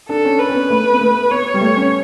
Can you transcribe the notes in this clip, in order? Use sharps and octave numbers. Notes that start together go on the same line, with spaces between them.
D4 A4
C#4
B4
C#4
B3
A3
B3
A3
B3 C#5
G3
A3
C#4